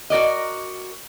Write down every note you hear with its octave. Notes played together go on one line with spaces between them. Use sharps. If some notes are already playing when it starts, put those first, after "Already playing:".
F#4 A#4 D5 D#5